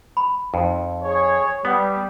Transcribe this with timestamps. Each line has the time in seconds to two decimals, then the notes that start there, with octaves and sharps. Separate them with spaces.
0.17 B5
0.54 F2 D#4
1.02 G#4 C#5
1.65 G3 B3 F#5 D#6